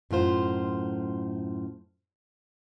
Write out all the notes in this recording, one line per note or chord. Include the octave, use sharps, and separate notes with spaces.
F#2 A2 F4 C5